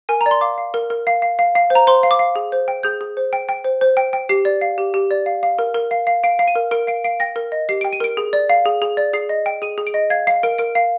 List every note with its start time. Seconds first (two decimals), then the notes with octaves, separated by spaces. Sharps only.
0.09 A#4 G#5
0.21 A#5
0.26 D5
0.31 C6
0.41 F5 D6
0.58 F5
0.74 A#4
0.90 A#4
1.07 F5
1.22 F5
1.39 F5
1.55 F5
1.70 C5
1.75 A#5
1.87 C5 C6
2.03 F5
2.11 D6
2.19 F5
2.36 G#4
2.52 C5
2.68 G5
2.83 G#4 G6
3.01 G#4
3.17 C5
3.33 G5
3.49 G5
3.64 C5
3.81 C5
3.97 G5
4.13 G5
4.29 G4 C7
4.45 D5
4.61 F5
4.78 G4
4.94 G4
5.11 D5
5.26 F5
5.43 F5
5.59 A#4
5.74 A#4
5.91 F5
6.07 F5
6.24 F5 D7
6.39 F5
6.48 D#7
6.55 A#4
6.71 A#4 D7
6.87 F5 D7
7.04 F5 D7
7.20 G5 A#6
7.36 A#4
7.52 D#5
7.69 G4 C7
7.81 D7
7.85 G5
7.93 D#7
8.00 A#4 D7
8.17 G#4
8.33 D5
8.49 F5
8.65 G#4
8.82 G#4
8.97 D5
9.13 G#4 C7
9.29 D#5
9.46 G5
9.62 G#4 D#7
9.78 G#4
9.87 D7
9.94 D#5
10.10 F5 G#6
10.27 F5 C7
10.43 A#4 D7
10.58 A#4 D7
10.75 F5